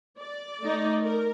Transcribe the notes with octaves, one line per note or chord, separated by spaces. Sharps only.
D5
A3 D#4
A#4